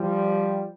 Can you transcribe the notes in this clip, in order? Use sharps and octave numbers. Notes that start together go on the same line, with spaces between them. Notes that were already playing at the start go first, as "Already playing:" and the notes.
Already playing: F3 G3